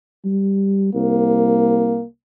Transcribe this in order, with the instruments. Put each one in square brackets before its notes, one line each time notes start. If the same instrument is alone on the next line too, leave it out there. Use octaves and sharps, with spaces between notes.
[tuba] G3
[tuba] C2 [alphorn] A#3